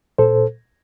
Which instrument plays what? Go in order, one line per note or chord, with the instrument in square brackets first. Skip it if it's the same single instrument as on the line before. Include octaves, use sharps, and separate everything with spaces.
[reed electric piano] A#2 A4 C5